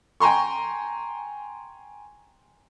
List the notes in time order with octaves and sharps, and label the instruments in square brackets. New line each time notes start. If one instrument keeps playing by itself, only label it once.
[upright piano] G5 G#5 A#5 C6 C#6